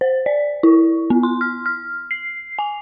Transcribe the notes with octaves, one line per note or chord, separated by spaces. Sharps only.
C5
D5
E4
B3
C6
F6
F6
C7
G#5